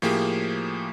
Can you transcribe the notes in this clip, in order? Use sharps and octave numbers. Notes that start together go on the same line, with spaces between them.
A2 F3 A#3 G4 G#4